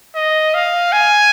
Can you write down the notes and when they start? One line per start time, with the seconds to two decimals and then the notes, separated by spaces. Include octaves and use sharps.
0.15 D#5
0.54 F5
0.92 G#5